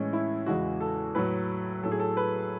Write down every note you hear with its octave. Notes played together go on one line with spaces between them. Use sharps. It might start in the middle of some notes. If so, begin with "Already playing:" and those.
Already playing: A2 E3 G#3 C#4
E4
E2 C#3 E3 G#3 F#4
A4
A2 F#3 B4
A2 F#3 A4
G#4
A4
B4